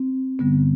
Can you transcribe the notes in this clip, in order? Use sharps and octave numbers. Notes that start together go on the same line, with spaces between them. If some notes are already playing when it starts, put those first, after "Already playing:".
Already playing: C4
G2 D3 G3 B3